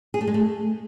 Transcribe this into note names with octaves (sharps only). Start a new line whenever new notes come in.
G#4
A3
G#3
A3